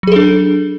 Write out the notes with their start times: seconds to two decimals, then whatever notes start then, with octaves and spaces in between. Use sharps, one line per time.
0.03 F#3
0.07 G#4
0.12 A4
0.16 D4